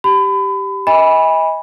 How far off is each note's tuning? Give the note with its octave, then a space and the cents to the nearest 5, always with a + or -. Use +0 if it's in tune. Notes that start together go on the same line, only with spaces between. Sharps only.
G4 -5 B5 +30
D#5 +35 G#5 -30 B5 -10